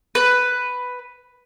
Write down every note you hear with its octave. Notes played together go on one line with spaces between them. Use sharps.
B4